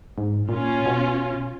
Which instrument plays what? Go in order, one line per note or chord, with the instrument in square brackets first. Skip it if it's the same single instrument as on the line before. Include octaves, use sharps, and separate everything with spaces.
[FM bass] G#2
[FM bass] A#2 [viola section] C#4 F4
[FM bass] B2